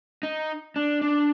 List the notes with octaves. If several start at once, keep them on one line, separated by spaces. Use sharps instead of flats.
D#4
D4
D4